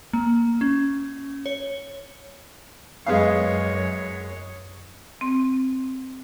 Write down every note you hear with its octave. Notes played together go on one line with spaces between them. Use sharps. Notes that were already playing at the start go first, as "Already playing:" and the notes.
A#3
C#4
C#5
F#2 G#3 B3 C#5 F5
C4